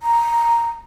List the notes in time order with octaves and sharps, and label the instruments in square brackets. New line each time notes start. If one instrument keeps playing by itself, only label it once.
[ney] A#5